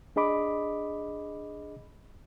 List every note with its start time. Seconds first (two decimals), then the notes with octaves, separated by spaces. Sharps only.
0.16 D4 G#4 D#5 B5 D6